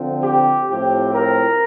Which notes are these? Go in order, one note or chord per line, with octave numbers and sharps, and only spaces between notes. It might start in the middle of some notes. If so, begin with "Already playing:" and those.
Already playing: D3 F3 C4
G4
A2 F3 C4 G4
A#4